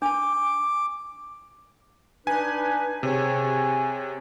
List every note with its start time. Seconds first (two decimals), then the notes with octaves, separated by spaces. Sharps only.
0.02 D4 A5 D6
2.27 D4 D#4 B4 G#5
3.03 C3 G#4 C#5 G#5